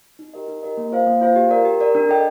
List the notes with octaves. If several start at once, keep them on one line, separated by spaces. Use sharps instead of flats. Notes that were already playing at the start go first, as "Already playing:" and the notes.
D#4
G4 A#4 D#5
D#4
G4 A#4 D#5
A#3
F4 C5 F5
A#3
F4 C5 F5
G4
A#4 D5
G4
A#4 D5
D4
A4 D#5 G5